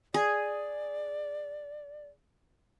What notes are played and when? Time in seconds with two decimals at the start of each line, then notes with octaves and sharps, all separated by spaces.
0.14 G#4 D5